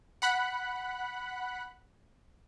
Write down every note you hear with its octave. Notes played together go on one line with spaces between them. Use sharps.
F#5 B5 F#6